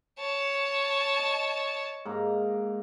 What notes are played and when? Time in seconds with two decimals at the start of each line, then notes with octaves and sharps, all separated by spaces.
0.19 C#5 A5
1.19 D#5
2.05 G#2 A#3 A#5